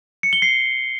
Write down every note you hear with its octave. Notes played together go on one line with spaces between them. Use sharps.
C#7
G7
C7